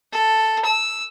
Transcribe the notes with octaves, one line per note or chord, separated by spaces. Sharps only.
A4
E6